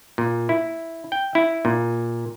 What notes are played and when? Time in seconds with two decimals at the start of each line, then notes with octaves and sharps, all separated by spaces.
0.18 A#2
0.49 E4
1.12 G5
1.35 E4
1.65 A#2